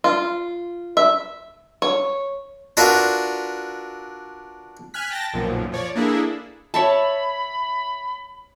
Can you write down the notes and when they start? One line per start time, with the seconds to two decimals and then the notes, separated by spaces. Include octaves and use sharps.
0.04 F4
0.97 E5
1.82 C#5
2.77 D4 F4 F#4 A#4 B4 E5
4.94 G#5 F6 F#6 B6
5.10 G5 A5 A6 A#6
5.33 B1 F#2 A#2 F3
5.72 F3 C#5 D5
5.96 A#3 D4 E4 G#4 A4
6.74 C#5 E5 A5 B5